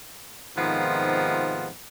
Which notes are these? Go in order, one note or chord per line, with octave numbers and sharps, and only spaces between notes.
G#2 C3 D#3 F3 B3 F4